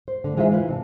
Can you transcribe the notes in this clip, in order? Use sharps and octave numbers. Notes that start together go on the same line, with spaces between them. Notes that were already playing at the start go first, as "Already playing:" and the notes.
C5
D3 A3
E3 G#3 D#4 F4 C5 E5
E3 F4 B4
C3 D#5 A5